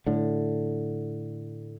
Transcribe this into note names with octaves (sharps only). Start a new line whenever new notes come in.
A2 D3